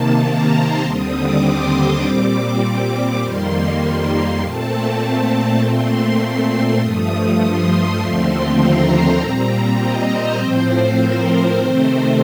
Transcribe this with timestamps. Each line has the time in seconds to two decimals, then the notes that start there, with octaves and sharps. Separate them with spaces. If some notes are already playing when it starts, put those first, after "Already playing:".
Already playing: C3 D#3 A#3 A5
0.24 A#5
0.54 C6
0.84 D#2 D3 G3 C4 D#6
1.14 D6
1.43 C6
1.73 C6
2.03 A#2 G3 C4 D6
3.22 F2 D#3 G3 A#3 C6
4.41 A#2 A3 C4 A5
5.61 A#2 A3 C4 C6
6.80 G2 F3 A3 D#6
7.40 C6
7.99 D#2 D3 F3 A3 C4
8.59 A#5
9.18 A#2 G3 C4
9.78 D#5
10.08 C5
10.38 A2 F3 C4
10.97 A#4
11.57 C3 D#3 A3 C4 C5